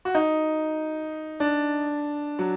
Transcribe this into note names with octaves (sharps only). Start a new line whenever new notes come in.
F#4
D#4
D4
F#3